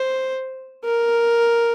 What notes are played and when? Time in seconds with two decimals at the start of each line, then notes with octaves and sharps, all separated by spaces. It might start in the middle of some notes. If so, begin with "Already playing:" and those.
Already playing: C5
0.85 A#4